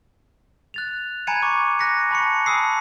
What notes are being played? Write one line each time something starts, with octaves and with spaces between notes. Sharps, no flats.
F#6 A6 F7
G#5 A#5 B5 G#6 C#7 D#7
C#6 D6
F#6 A#6 B6 C#7
A5 B5 C#6 C#7
G#5 A5 B5 D#6 E6 C7